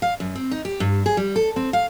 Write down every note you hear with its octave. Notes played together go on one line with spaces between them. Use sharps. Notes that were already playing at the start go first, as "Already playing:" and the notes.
F5
F#2
C4
D#4
G4
G2
G#4
G3
A4
C4
F5